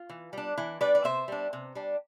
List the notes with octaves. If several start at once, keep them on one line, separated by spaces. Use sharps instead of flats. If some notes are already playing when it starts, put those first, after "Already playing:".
Already playing: F4
E3
G3 D4
E3 E4
G3 D4 B4 D5
D5
C3 C5 E5
G3 D4
C3
G3 D4